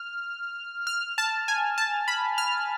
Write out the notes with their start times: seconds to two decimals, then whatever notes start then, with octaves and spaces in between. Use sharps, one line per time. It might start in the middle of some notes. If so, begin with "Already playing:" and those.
Already playing: F6
0.87 F6
1.18 A5
1.48 G#5
1.78 A5
2.08 B5
2.38 F6